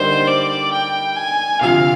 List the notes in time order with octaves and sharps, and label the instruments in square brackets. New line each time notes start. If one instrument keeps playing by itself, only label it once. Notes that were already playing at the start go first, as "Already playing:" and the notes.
Already playing: [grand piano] D3 G3 A#3 D#4 G4 [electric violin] C5
[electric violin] D5
G5
G#5
[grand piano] D2 C3 F3 [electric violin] F5